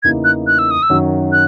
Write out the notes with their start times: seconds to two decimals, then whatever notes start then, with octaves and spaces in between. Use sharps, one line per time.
0.03 E2 C#3 E3 A#3 D#4 G#6
0.24 F#6
0.47 F#6
0.59 E6
0.71 D#6
0.83 E6
0.90 F#2 D#3 F#3
1.32 F#6